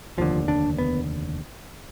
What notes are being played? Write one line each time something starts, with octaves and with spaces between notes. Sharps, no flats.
F1 D#2 D3 F3
D4
B3